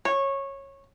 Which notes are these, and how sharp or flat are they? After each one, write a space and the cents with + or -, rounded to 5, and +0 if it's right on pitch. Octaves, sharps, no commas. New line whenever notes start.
C#5 -15